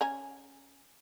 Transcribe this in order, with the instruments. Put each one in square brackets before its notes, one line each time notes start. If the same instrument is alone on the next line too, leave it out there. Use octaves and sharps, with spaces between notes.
[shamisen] C#4 G#5 A#5